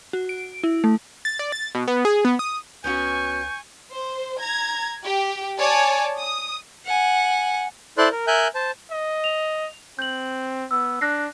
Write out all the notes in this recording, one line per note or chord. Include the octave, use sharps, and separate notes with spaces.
F#4
D7
E4
A3
A6
D5
A6
B2
B3
G#4
B3
D#6
C#2 B3 C#4 F#4 G#5 C#6 G6
C5
A#5 G#6
G4
C#5 D5 G#5 A5 D6
D#6
F#5 G#5
E4 A4 C5 D5 C6 F#6
A#4
A#4 E5 G#5 F#6 G6
C5 A5
D#5
F7
C4 G6 F#7
B3 E6
D4 F#6 A#6 C7